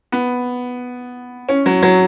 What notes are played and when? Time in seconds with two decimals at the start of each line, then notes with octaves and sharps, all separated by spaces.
0.12 B3
1.49 C#4
1.66 F#3
1.83 F#3